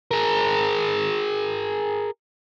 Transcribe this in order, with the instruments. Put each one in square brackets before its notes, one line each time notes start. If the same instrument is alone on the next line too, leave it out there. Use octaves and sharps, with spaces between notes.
[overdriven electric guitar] G#4 A#4